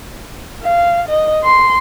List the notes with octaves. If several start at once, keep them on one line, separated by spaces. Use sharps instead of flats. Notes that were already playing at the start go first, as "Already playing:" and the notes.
F5
D#5
C6